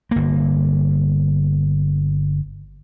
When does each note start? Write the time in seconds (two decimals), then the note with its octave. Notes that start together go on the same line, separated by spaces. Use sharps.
0.11 G1 A#3